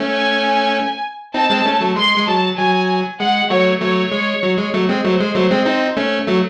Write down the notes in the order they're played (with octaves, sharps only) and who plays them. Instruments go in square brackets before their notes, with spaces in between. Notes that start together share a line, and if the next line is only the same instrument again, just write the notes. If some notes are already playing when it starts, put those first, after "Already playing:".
Already playing: [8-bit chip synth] A3 C#4
[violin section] G#5
[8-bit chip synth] C4 D#4 [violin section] A5
[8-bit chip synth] G#3 C4
A3 C#4
F#3 A3
[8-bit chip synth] G#3 [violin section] C6
[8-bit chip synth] G#3
[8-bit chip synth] F#3 [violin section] A5
[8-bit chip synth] F#3 [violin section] G#5
[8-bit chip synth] G#3 [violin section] F#5
[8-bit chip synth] F#3 A3 [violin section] C#5
[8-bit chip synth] F#3 A3 [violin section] C#5
[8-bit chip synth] G#3
F#3
G#3
F#3 A3
G#3 C4
[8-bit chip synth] F#3 A3 [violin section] C5
[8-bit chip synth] G#3
F#3 A3
G#3 C4
C4 D#4
A3 C#4
F#3 A3